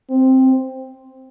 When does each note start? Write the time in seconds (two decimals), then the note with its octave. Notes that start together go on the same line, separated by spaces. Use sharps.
0.10 C4